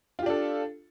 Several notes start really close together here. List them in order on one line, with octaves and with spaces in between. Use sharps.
F4 G4 D4 A4